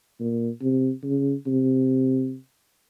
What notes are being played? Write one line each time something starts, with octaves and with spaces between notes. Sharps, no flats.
A#2
C3
C#3
C3